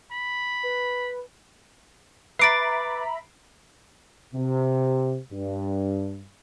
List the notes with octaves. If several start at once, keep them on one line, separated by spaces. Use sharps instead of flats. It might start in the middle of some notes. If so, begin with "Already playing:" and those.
B5
B4
B4 E5 A#5 B5 D6 A6 C7 D7
C3
G2